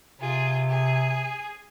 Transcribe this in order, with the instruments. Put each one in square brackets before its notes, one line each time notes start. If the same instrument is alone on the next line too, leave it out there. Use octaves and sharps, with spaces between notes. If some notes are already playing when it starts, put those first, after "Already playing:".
[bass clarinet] C3 [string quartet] F4 G#4
[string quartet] G#4